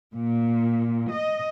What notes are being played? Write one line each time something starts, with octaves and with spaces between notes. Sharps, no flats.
A#2
D#5